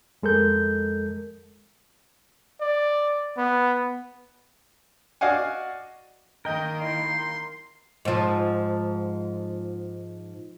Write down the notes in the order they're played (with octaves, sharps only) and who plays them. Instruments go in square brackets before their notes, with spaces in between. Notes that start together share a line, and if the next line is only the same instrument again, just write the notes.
[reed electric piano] F2 G#3 A4 A#4 G6
[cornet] D5
B3
[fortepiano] F#4 D5 D#5 F5 F#5 G#5
[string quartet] D#3 A#3 [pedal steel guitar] A#4 G5 [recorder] D#5
[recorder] E4 [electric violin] C6
[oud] G#2 F3